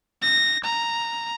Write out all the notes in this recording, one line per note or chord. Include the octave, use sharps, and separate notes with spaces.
A#6
A#5